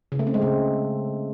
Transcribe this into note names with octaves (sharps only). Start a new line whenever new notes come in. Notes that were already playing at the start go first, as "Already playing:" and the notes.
C#3
A3
C4
G#3
C#3